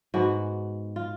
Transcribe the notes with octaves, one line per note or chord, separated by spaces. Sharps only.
G#2 G#3 B3 F#4
F4